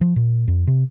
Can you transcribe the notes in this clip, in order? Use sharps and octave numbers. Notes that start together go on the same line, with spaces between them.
F3
A#2
F2
C3